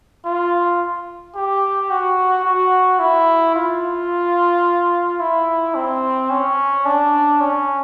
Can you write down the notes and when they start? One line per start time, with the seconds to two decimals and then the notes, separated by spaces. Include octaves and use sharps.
0.25 F4
1.35 G4
1.90 F#4
2.45 F#4
2.99 E4
3.55 F4
5.20 E4
5.75 C4
6.30 C#4
6.85 D4
7.40 C#4